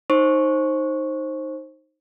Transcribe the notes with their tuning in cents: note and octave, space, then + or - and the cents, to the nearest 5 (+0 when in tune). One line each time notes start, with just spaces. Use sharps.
D#4 +0 C5 +20 C#6 +0